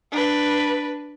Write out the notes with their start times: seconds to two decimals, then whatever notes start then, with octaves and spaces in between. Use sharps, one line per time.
0.11 D4 B4